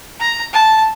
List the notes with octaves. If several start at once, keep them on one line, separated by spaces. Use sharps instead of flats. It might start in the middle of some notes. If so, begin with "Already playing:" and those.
A#5
A5